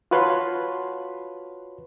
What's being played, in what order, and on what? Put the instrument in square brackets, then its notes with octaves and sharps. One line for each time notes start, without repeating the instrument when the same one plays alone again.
[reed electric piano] F4 F#4 B4 C#5 A5 C6